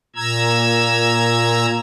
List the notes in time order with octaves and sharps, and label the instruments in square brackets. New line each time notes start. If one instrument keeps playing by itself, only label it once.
[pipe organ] A#2 A#5 E6 G#6